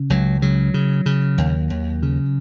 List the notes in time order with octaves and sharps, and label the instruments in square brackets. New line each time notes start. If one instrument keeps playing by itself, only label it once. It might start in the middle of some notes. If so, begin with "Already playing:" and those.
Already playing: [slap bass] C#3
C#2 F#3
C#3 F#3
C#3
C#3
D#2
D#2
C#3